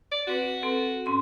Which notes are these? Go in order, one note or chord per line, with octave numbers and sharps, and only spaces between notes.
D5
C4 F#4 B4
C4 A4 B4
G#2 C#4 C6